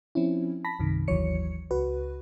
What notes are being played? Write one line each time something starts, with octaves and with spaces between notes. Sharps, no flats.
F3 C4 C#4 E4
A5 B5 A#6 B6
B1 F#2 C3 D#3
G#1 D#2 E3 F#3 C#5 C#7
C#2 F#4 B4